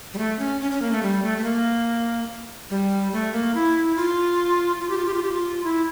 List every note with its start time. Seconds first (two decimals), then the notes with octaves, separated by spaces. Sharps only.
0.14 G3
0.18 A3
0.39 C#4
0.61 C#4
0.71 C#4
0.82 A#3
0.92 A3
1.03 G3
1.23 A3
1.38 A3
1.44 A#3
2.70 G3
3.13 A3
3.33 A#3
3.55 E4
3.96 F4
4.80 F4
4.90 G4
4.97 F4
5.06 G4
5.14 F4
5.23 G4
5.32 F4
5.64 E4